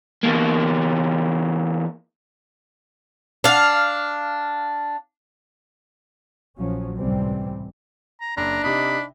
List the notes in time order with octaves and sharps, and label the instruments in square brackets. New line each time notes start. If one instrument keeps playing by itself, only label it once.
[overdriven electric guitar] E2 A#3
[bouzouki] D4 F5
[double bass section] A#1 F3 F#3 C#4
C#2 A2 C3 E3 G3 C4
[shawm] A#5
[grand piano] F#1 [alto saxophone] D4 [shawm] A#5
[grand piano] C3 D#4 [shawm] B5